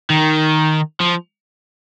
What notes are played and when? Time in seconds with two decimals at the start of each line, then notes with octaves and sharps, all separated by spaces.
0.10 D#3
1.01 F3